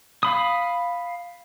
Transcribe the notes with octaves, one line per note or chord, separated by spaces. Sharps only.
F5 B5 D#6